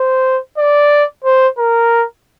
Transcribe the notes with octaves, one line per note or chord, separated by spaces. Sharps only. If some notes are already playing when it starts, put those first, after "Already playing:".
Already playing: C5
D5
C5
A#4